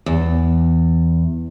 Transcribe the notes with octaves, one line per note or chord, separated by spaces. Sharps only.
E2